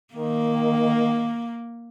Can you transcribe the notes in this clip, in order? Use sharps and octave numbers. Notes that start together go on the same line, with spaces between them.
D#3 A#3